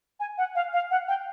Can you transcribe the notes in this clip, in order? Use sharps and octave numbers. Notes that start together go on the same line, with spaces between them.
G#5
F#5
F5
F5
F#5
G5